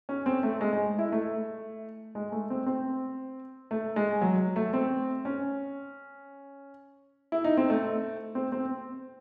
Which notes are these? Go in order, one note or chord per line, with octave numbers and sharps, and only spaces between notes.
C#4
C4
A3
G#3
G#3
E4
A3
G#3
A3
C4
C4
A3
G#3
F#3
A3
C4
C#4
E4
D#4
C4
A3
C4
C4